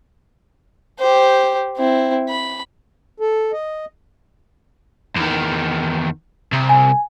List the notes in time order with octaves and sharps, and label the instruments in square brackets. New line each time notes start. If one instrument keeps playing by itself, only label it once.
[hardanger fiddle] G4 C5
C4 E4
B5
[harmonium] A4
D#5
[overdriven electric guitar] E2 D#3
C2
[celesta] G#5